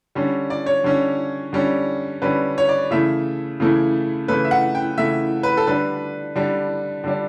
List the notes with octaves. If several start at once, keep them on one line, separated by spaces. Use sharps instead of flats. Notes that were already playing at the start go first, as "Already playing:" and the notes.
D3 G3 C#4
D5
C#5
D3 G3 C#4
D3 G3 C#4
D3 G3 C#4 B4
C#5
D5
C#3 E3 A3 E4 E5
C#3 E3 A3 E4
C#3 E3 A3 E4 B4
E5
F#5
G5
C#3 E3 A3 E4 E5
B4
A4
D3 G3 D4 B4
D3 G3 D4
D3 G3 D4